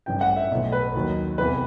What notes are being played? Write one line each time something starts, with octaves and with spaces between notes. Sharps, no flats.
A1 G2 E3 G5
F#5
E5
B1 A2 E3
B4
D#2 D#3 F#3
E2 C3 E3 B4